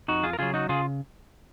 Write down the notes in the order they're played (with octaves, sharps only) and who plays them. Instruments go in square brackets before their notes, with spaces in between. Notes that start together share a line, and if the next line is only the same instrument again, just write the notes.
[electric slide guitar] F2 D#4 F#4
F4 G#4
A#4
C#3 F#3 F4 G#4
D#4 F#4
C#3 F4 G#4